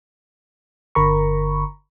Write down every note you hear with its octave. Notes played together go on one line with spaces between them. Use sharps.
G1 D3 A#4 A#5 B5 C#6